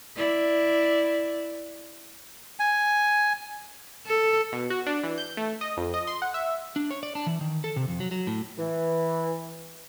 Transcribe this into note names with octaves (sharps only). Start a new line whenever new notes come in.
E4 D5
G#5
A4
B2
F#4
D4
E3
G6
A3
D#5
F2
D#5
C6
F#5
E5
D4
C#5
D5
D4
E3
D#3
A4
C3
F2
F#3
F#3
A2
E3